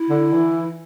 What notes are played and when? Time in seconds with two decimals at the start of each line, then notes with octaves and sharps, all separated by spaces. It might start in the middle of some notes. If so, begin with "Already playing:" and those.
Already playing: E4
0.10 D3
0.33 E3